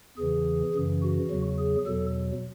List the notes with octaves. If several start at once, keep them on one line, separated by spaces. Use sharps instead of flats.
E2 C#3 E3 G#4
F#2 C#3 E3
F#4
E2 C#3 F#3
G#4
E2 B2 F#3 A4